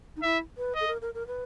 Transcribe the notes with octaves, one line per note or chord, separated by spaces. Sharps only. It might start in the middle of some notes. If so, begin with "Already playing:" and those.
D#4
E4 E5
B4
D#5
A4
A#4
A#4
A#4
B4